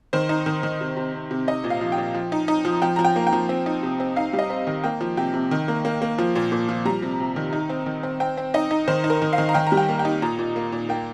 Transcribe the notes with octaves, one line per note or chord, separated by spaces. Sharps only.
D#3 C5
D#4
D#3
D#3
C3
C3
C3
C3
D#4 D#5
A#2
F5
F3
G5
A#2
F3
D#4
D#4
F3
F3 G5
F3 A#5
G5
A#3
G5
F3
C4
D#4
C3
C4
D#4 F5
G3
D#5
C4
D#3
A#3 G5
F3
C3 G5
C3
D#3
A#3
A#3
A#3
F3
A#2
A#2
F3
G3 A#5
C3
C3
D#3
D#4
C4
D#3
C4
C4 G5
C4
D#4 D#5
D#4
D#3 C5
D#4
A#4
D#3
F5
D#3
A#5
D#3 G5
A#5
G3
G5
A#3
G5
D#4
A#2 A#5
A#2
A#3
A#2
A#3 G5